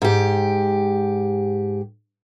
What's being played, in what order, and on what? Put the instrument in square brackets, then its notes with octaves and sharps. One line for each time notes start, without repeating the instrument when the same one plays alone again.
[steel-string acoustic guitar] G#2 G4